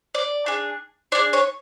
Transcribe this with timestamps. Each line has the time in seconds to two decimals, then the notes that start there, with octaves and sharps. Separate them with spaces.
0.15 D5
0.46 D4 G#4
1.12 D4 D5
1.15 G#4
1.33 C#5